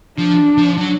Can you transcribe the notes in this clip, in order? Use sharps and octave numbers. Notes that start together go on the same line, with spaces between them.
F3 D4
F3
F#3